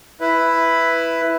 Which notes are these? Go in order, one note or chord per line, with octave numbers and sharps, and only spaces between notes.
E4 B4